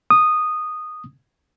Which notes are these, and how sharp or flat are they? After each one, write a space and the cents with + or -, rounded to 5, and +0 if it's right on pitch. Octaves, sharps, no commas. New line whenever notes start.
D#6 -10